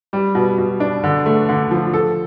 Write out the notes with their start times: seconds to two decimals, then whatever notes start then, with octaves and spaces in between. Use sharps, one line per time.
0.13 G3
0.35 B2
0.58 B2
0.80 D4
1.04 D3
1.26 A3
1.49 D3
1.71 F3
1.93 A4